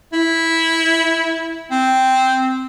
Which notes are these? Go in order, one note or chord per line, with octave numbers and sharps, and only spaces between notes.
E4
C4